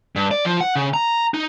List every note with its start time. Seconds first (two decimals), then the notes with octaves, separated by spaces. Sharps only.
0.16 G2
0.31 D5
0.45 F3
0.61 F#5
0.76 C#3
0.94 A#5
1.34 D#4